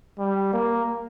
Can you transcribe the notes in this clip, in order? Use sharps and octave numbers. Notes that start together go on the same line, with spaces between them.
G3
A#3